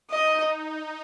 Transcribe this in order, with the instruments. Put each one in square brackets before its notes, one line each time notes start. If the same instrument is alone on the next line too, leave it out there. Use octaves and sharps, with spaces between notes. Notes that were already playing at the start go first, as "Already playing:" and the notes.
[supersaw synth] D#4 [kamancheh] D#5